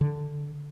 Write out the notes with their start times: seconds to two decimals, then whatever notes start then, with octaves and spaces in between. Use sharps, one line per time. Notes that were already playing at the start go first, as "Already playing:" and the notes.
0.01 D3